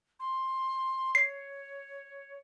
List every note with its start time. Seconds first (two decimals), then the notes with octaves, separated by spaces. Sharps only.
0.20 C6
1.15 C#5 C7